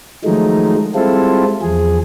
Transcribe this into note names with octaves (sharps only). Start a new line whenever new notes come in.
D#3 F3 F#3 G#3 A3 D#4
G3 G#3 C4 E4 F4 A4
E2 F3 G#4